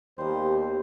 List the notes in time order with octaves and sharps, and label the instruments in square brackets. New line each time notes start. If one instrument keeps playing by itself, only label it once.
[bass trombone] D#2 [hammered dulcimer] B2 G3 [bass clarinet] C5